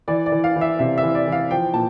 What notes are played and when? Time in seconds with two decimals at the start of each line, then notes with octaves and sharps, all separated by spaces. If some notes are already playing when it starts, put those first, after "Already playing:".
0.08 E3 D5
0.26 D5
0.32 E3
0.44 F5
0.56 E3
0.61 E5
0.79 C3 E5
0.98 E5
1.03 E3
1.15 D5
1.27 E3
1.32 F5
1.51 F3 G5
1.74 A#2 A5